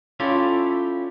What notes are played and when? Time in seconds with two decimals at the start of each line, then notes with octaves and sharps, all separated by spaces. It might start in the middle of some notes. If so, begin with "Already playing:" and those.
0.20 C#4 E4 F4 G4 A4 D5